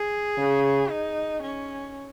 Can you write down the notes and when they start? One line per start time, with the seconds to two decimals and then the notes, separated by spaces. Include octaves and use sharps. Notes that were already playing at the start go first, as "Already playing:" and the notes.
Already playing: G#4
0.38 C#3
0.90 D#4
1.42 C#4